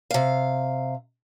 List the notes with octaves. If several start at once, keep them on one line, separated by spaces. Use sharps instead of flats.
C3 F5